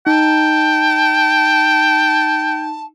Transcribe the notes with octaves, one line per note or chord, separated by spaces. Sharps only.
D#4 G5 A5